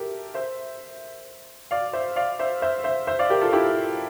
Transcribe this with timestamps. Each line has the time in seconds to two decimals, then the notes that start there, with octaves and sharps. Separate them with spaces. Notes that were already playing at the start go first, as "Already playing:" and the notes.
Already playing: G4 A4 A#4 E5
0.34 C5 E5
1.71 D5 F5
1.93 C5 E5
2.16 D5 F5
2.39 C5 E5
2.62 C5 E5
2.84 C5 E5
3.07 C5 E5
3.19 D5 F5
3.30 G4 A#4
3.41 F4 A4
3.53 E4 G4